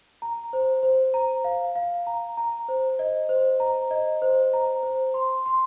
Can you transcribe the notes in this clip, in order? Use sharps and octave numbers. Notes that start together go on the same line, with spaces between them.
A#5
C5
C5
A#5
F5
F5
A#5
A#5
C5
D#5
C5
A#5
D#5
C5
A#5
C5
C6
C6